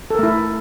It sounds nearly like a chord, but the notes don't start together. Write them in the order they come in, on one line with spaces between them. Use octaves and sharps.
A4 A#4 A3 E4